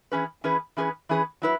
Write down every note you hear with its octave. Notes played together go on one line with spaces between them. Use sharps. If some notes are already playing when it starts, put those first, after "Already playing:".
E3 C#4 G#4 B4
E3 C#4 G#4 B4
E3 C#4 G#4 B4
E3 C#4 G#4 B4
F#3 E4 B4